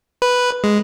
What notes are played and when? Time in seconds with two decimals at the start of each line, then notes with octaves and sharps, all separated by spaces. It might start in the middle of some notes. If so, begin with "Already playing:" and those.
0.22 B4
0.64 G#3